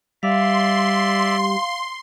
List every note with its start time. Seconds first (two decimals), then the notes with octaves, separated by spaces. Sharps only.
0.23 G3 D5 E5 F5 C6